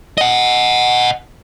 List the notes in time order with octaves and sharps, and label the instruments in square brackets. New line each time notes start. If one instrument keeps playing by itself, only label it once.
[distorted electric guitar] D#5 F#5